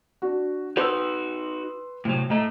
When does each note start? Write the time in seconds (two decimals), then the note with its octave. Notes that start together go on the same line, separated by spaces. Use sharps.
0.22 D4 F#4
0.77 D#4 F#4 B4 C6 E6
2.05 A2 C3 F#3
2.30 A2 A3 D#5 A#5